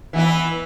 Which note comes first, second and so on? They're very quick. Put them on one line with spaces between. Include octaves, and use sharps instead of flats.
E3 B3 E4